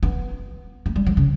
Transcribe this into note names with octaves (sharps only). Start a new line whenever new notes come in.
B3
A3
G3
F#3
C#3